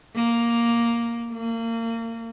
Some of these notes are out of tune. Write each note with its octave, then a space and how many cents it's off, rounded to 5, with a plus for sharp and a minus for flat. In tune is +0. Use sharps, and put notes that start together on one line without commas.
A#3 +5
A#3 -30